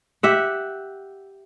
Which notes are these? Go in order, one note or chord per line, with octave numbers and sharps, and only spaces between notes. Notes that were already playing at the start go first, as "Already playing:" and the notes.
G4 E5 F#5